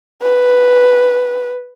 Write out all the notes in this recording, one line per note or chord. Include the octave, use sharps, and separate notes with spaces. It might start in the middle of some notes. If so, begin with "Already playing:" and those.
B4